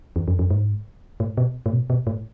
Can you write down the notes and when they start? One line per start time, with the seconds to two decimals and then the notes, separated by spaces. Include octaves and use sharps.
0.16 E2
0.28 F2
0.39 F2
0.50 G#2
1.20 A2
1.37 B2
1.66 A2
1.72 B2
1.90 B2
2.07 A2